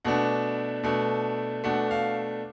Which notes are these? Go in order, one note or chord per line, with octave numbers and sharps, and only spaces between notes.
B2 A3 D4 F#5
B2 A3 D4
B2 A3 D4 F#5
F5